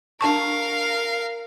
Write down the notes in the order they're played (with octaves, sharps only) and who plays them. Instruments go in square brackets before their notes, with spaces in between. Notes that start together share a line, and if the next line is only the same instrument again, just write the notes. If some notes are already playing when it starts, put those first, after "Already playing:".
[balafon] D4 A5 C#6 [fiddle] A#4 F5